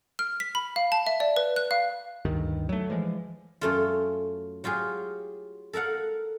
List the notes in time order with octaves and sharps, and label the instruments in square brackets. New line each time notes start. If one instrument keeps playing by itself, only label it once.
[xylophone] F6
B6
B5
F5
A5
E5
D5
B4
F#6
F5
[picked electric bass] D2 G2 D#3
F#3 A3
E3 F3 G#3
[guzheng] F#2 A3 F4
F#3 F4 G4 G#4
A4 A#4 F5 F#5